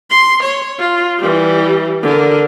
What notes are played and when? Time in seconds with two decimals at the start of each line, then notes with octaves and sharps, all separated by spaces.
0.10 C6
0.43 C#5
0.80 F4
1.19 E3 G3
2.03 D3 A#4